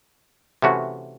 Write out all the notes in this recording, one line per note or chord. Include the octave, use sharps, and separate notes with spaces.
C3 E3 A3 C#4 F#4